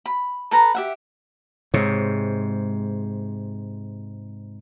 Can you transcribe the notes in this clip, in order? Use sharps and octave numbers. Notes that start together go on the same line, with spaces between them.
B5
A4 B4 A#5
G4 E5 F#5
G#2 C3 G#3 C#5